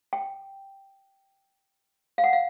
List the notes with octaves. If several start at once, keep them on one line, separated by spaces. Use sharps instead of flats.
G5
F5
F#5
F5